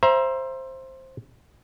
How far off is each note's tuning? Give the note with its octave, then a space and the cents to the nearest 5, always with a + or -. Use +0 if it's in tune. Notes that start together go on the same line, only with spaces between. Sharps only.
C5 +10 E5 +25 A#5 +30